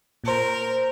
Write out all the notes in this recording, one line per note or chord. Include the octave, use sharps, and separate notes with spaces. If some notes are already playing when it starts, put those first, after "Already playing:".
A#2 A#4 C5